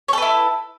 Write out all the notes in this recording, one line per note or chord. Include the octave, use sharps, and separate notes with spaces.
E4 A4 B4 C#5